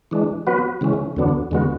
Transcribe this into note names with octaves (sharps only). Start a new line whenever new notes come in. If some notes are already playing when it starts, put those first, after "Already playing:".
E3 G#3 D4
F#3 B3 F#4 B4
C#3 E3 G#3 C#4
E2 D3 F#3 B3 D4
E2 D3 G#3 B3 F#4